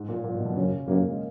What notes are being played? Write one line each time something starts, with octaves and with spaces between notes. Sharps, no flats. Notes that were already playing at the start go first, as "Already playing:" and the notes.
Already playing: G#2
A#2
A#2
B2
B2
F#2 C#3
F#2 A#3
A#3
G#3